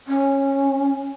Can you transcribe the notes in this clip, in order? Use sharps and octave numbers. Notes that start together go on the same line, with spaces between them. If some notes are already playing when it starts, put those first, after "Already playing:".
C#4